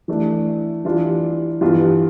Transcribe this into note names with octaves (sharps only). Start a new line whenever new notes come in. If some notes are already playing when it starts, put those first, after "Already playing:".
E3 A3 D4
E3 G3 D4 F4
G2 E3 B3 F4